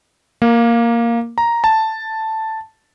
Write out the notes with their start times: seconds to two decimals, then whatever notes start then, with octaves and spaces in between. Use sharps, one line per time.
0.42 A#3
1.38 A#5
1.64 A5